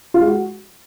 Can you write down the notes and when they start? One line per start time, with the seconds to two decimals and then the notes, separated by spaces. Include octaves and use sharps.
0.14 F4
0.21 G#3
0.28 F#4